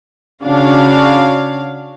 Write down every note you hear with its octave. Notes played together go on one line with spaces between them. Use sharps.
C#3 D4 F#4 C#5 F5